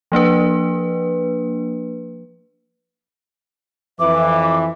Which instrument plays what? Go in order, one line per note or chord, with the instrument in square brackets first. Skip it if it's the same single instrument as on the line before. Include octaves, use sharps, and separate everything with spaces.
[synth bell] F3 A#3 D4 B4
[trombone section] F2 E3 [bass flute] E5 [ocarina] D6